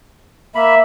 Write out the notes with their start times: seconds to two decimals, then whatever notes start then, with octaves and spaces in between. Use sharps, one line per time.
0.55 A#3 E5 B5